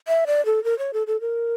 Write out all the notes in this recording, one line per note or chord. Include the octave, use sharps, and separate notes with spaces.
E5
D5
A4
A#4
C#5
A4
A4
A#4